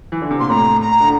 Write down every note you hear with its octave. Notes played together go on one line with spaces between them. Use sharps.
E3
D3
C3
A#2 C6
A2 A#5
A#5
D3